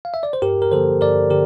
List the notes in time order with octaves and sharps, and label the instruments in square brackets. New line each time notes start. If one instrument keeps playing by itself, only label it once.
[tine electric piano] F5
E5
D5
C5
G2 G4 A#4
A#4
D3 F3 A#3 A4 C5
G2 A#4 D5
D3 G4 A#4